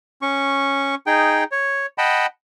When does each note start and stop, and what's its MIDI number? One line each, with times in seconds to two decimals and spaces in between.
0.22 0.95 61
0.22 0.95 85
1.07 1.44 63
1.07 1.44 68
1.07 1.44 79
1.52 1.86 73
1.98 2.26 75
1.98 2.26 78
1.98 2.26 79
1.98 2.26 81
1.98 2.26 83